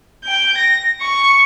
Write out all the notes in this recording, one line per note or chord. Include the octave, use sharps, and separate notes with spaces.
G5 G6
A#6
C#6